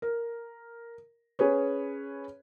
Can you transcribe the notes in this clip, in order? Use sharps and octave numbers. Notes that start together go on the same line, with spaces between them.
A#4
C#4 G#4 B4 C#5